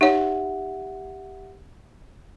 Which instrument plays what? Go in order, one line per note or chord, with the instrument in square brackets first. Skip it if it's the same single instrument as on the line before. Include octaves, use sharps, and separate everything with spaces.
[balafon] D#4 C#5 [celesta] G4 E5 F#5